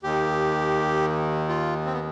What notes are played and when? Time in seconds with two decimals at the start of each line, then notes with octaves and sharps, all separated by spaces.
0.03 D#2 D#3 G4
1.49 F4
1.86 C4
1.93 B3